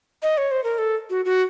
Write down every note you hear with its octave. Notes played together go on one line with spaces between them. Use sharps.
D#5
C#5
C5
A#4
A4
F#4
F#4